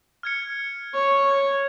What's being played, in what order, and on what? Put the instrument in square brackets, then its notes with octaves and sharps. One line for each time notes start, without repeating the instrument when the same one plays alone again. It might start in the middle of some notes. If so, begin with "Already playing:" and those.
[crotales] F6 G#6 C#7
[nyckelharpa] C#5
[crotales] G#6